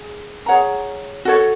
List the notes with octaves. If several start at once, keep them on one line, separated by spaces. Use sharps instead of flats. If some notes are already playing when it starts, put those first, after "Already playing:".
Already playing: G#4
G#4 C#5 F#5 A#5
F#4 A4 C#5